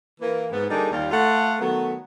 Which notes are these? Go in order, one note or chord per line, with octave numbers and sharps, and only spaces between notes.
E3 A#3
G#2 B3
D3 G3 A#3 D4 D#4 G#4
D#2 G3 F4
A3 F4 F#5
D#3 F#3 A3 B3